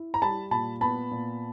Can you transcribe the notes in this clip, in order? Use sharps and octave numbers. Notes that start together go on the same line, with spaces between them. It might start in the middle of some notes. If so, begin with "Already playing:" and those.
Already playing: E4
A#5
G3 A5 B5
A#2 A5 B5
B3 A5 B5
A#2